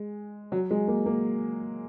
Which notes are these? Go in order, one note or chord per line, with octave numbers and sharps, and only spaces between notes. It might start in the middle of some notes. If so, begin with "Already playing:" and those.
Already playing: G#3
F#3
G#3
A#3
A#3